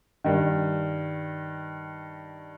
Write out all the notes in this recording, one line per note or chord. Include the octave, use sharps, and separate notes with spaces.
G2 D#3